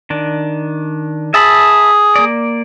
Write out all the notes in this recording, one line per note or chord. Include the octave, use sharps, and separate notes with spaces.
D#3 D4
G#4 E5 A5 B5
A#3 D5